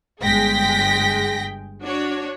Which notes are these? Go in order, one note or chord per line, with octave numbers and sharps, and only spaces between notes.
G1 G#3 G#4 G5 A#6 B6
D4 F#4 C#5